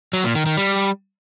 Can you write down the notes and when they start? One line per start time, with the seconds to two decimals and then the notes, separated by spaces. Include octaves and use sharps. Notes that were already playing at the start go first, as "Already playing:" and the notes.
0.13 F#3
0.24 A#2
0.35 D#3
0.46 D#3
0.57 G3